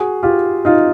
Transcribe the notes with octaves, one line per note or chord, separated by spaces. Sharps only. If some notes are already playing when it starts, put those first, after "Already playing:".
Already playing: F#4 G#4
F4 G4
D#4 F4